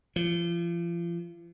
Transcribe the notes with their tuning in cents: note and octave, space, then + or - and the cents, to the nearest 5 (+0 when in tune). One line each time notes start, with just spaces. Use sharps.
F3 -35